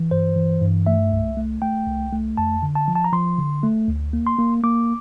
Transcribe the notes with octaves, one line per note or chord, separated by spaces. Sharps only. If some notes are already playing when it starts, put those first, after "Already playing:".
Already playing: E3
G2 C5
E3
G2
A3 E5
C2
A3
A3 G5
C2
A3
F2 A5
D3
A5
F3
A5
A#5
F3 C6
D3
A3
D2
A#3
C6
A#3
A#3 D6